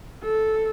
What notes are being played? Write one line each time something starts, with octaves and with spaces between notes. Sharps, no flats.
A4